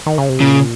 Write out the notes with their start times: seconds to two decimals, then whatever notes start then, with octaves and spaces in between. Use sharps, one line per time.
0.06 D#3
0.18 C#3
0.29 C3
0.40 A#2 C#3